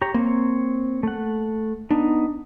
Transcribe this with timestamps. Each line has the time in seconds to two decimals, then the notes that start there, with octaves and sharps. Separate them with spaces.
0.02 G4 C#5 A#5
0.14 A#3 C4 C#5
1.03 A3 F#5
1.91 B3 D4 D#4